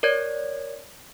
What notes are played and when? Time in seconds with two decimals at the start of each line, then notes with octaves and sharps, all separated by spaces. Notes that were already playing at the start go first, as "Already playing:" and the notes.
0.03 A#4 C#5 D5 G#6